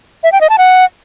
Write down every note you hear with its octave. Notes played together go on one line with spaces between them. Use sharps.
E5
G5
D#5
A5
F#5